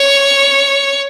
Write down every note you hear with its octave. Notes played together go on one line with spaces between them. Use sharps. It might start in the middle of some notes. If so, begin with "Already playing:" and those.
Already playing: C#5